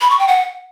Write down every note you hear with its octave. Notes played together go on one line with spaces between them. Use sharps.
B5
C#6
G5
F#5